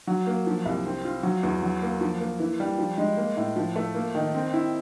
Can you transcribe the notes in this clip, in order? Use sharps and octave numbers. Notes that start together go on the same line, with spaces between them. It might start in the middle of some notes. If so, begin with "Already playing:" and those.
F#3
A#3
F3
C2
C4
F4
F#3
E2
F#3
A#3
F3
A#3
E3
G3
F3
G#3
A#3
A2
F3
A3
A#3
D#3
C4
E4